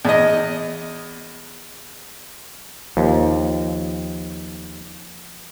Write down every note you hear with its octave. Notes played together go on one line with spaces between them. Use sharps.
E2 D#5
D#2 F3